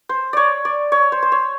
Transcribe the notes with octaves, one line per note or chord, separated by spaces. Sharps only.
C5
C#5 D5
D5
C#5
C5
C5
C#5